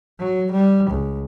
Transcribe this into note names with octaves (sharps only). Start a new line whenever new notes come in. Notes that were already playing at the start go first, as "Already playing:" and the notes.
F#3
G3
C#2